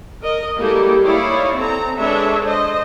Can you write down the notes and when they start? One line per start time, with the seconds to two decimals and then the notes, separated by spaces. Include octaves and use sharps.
0.22 A#4 D#5
0.58 G3 G#3 A#3 E4 G4 A4
1.04 D#4 E4 C#5 D5 F5
1.56 C4 A4 A#5
1.98 G#3 D4 A4 B4 C#5 E5
2.43 C5 D#5